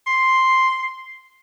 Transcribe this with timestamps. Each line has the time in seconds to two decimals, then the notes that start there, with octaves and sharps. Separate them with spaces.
0.07 C6